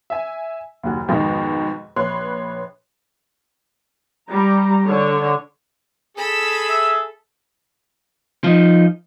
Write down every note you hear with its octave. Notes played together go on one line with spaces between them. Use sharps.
E5 G#5
F#1 D#2 F#4
F2 G#2 B2 D#3
A#1 B4 C#5 C6 F#6
G3 A#5
D3 C#5
G#4 A4 B5 E6
E5
F3 D#4